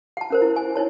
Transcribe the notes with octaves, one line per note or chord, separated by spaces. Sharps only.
F#5 A5
C#4 A#4 C5
E4
G#5
D#4 E4 C#5 A5